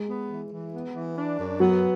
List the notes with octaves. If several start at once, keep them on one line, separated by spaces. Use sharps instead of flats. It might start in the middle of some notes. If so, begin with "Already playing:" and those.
Already playing: G#3
B3
E3
E3
B3
E3
D4
F#2
F#3 B3